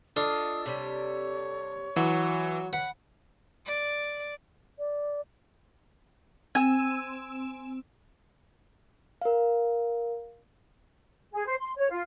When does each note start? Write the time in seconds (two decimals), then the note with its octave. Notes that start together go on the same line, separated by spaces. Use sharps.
0.16 D4 F4 A4 D#5 F5 D#6
0.66 C3 G3 C#5
1.96 E3 F#3 F#4
2.73 B4 F#5
3.66 D5
4.79 D5
6.55 C4 G#5 E6 E7
9.22 A#4 F5
11.33 G#4
11.46 C5
11.60 C6
11.76 C#5
11.89 F4